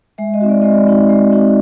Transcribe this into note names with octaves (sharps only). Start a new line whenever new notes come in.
G#3 E5
D#5
C4 D#4 F#4
D5
G#3 D#5
D5
C4 D#4 F#4
G#3
C4 D#4 F#4